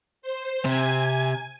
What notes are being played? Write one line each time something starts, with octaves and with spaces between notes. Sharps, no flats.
C5
C3 G#5 G#6